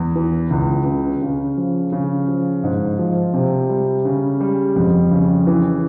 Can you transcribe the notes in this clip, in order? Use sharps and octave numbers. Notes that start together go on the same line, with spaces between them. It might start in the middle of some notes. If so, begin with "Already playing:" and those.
Already playing: E2
E3
C#2
C#3
C#3
F3
C#3
F3
G#2
F3
C3
G3
C#3
G3
F2
C#3
E3